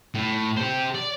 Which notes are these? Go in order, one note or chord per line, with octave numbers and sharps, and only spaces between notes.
A2
G4 C5
D5